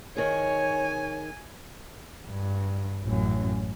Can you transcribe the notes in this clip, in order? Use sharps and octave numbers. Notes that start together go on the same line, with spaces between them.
D#3 G#4 C#5 G#5
G2
A1 F#2